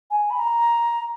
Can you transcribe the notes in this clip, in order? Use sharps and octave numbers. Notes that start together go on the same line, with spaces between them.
G#5
B5
A#5